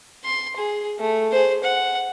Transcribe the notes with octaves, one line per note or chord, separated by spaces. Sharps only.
C6
G#4
A3
G#4 C5
F#5